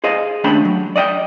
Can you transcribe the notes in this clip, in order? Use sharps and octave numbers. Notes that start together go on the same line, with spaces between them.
G#4 C5 D#5 F5
D#2 A3 C#4 D4 G5 B5
F#3
D5 D#5 F#5 G5